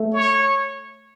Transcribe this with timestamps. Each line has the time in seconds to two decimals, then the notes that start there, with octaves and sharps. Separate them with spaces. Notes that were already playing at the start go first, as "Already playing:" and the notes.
Already playing: A3
0.13 C#5